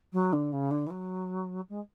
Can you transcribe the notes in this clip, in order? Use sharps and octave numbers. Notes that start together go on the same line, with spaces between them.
F#3
D3
C#3
D3
E3
F#3
G#3